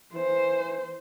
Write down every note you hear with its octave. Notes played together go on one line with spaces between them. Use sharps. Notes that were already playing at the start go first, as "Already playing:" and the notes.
E3 C5